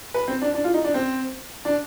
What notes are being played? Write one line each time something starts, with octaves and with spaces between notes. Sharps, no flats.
B4
C4
D4
D4
F4
D#4
D4
C4
D4